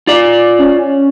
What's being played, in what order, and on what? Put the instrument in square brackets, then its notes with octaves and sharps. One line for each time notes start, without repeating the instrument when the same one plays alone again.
[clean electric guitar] F4 D5
[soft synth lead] C#4